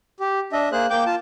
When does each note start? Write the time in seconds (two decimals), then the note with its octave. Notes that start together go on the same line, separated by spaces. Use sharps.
0.20 G4
0.53 D4 D#5 E5
0.72 A#3 G#4 C5 F#6
0.90 A#3 G5 D6 G6
1.06 F4 A5